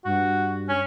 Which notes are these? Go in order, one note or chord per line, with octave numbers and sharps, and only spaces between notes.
G2 F#4
C#4